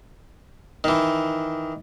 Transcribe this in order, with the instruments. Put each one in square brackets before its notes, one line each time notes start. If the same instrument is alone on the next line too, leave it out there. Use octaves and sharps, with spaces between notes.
[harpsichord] D#3 E3